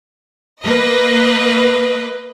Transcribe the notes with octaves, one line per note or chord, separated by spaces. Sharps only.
A#3 B4 D#5